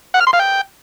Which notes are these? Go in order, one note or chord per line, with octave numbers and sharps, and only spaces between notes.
F#5
F6
C6
F5
G5